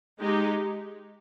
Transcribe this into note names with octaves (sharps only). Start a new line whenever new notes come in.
G#3 D#4 G4